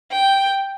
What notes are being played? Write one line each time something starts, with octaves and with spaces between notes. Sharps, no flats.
G5